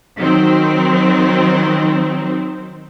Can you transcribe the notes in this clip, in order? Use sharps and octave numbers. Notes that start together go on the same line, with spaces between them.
D#3 F#3 C4